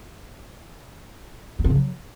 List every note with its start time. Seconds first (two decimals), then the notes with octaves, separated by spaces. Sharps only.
1.59 B3
1.64 C4
1.70 C#3
1.75 F#3